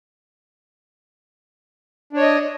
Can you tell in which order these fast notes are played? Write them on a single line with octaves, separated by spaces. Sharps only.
D4 C#5 D#5